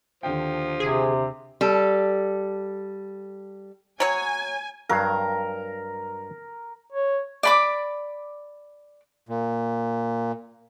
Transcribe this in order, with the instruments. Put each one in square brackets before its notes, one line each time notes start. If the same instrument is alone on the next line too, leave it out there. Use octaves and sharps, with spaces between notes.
[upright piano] D#2 D3 G5 [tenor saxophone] F3
[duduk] C3 [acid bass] G#4
[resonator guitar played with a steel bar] G3 A4
[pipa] F#3 C#5 [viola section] G#5
[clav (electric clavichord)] G2 F#3 F5 [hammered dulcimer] A#4
[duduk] C#5
[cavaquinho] D5 B5 D6
[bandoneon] A#2